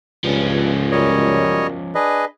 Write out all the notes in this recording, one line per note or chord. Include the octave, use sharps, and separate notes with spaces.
C#2 G2 F3 C#4
F#2 G3 C#5 D#5
D4 G#4 B4 D#5